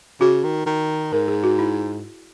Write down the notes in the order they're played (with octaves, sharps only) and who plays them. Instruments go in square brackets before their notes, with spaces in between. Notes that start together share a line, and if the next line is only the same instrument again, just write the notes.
[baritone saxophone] C#3 [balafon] F#4
[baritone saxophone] D#3
D#3
[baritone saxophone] G#2 [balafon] A#4
[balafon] G#4
F#4
E4